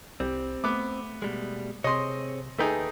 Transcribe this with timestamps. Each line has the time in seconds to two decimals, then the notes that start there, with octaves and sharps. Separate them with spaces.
0.20 C2 G3 C4
0.64 A3 B3 D6
1.22 B2 G3 G#3
1.84 C3 C4 G#4 C#5 D#5 C6
2.58 D#2 A3 D#4 G#4 B4 G5